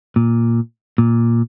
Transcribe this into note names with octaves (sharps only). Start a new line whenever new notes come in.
A#2
A#2